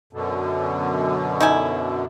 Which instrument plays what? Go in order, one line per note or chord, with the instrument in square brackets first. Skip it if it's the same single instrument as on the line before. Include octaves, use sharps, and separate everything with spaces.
[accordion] F#2 B2 D3
[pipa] D#4 E4 G#5